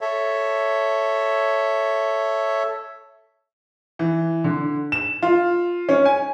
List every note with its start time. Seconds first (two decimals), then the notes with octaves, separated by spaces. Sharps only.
0.01 A4 C#5 E5
3.99 E3
4.44 D3
4.92 E7
5.22 F4
5.89 C#4
6.05 G#5